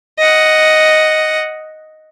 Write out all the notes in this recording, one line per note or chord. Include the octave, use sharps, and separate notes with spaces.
D#5 F#5